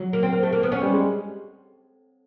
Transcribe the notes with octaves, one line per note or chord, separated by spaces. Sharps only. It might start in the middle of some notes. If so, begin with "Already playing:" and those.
Already playing: F#3
A#3
C4
A#3
A3
A#3
B3
C#4
G3
G#3